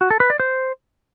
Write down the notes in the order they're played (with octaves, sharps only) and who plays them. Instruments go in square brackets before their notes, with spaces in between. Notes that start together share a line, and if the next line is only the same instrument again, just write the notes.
[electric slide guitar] F#4
A4
B4
D5
C5